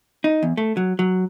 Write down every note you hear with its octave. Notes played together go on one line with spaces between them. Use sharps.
D#4
E2
A3
F#3
F#3